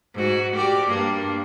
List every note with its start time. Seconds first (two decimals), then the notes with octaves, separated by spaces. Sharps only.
0.14 G#2 F#4
0.56 G4 A#4 D5
0.87 G2 A#3 D4